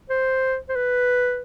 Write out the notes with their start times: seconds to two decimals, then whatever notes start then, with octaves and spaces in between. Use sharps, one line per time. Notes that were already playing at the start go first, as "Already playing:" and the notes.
0.10 C5
0.69 C5
0.76 B4